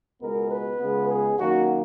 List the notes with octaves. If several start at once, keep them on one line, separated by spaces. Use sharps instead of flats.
C#2 B2 G#3 B3 A#4
B4
C#2 C#3 G#3 B3
G#4
F#2 D#3 A#3 F#4